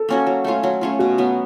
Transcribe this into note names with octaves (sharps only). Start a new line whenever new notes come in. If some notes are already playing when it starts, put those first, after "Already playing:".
Already playing: A4
A#3 C#4 F#4
F#3
A3 C#4 F4
F#3
A3 C#4 F4
B2 F#4
F#3 B3